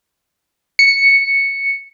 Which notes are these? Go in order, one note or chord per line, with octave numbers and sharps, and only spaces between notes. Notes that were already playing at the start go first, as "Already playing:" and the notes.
C#7